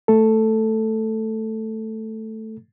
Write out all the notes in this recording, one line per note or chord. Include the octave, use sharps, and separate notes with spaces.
A3 A4